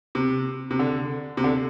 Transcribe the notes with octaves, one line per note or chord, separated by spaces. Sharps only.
C3
C3
D3
C3
D3